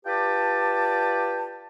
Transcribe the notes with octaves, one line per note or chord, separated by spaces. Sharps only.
F4 G4 B4 D5 G5 A5